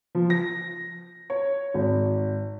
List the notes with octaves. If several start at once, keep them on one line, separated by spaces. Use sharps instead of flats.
F3
A#6
C#5
G#1